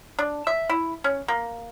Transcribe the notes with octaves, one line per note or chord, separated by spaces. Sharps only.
D4
E5
E4
C#4
A#3